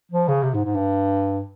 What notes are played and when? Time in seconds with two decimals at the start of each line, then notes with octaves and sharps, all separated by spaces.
0.12 F3
0.28 C#3
0.43 C3
0.54 G#2
0.64 G#2
0.74 G2